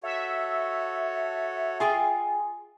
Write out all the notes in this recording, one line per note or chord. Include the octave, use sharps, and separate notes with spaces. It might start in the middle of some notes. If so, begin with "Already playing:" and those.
F#4 A4 C#5 E5
F4 G#4 G5 G#5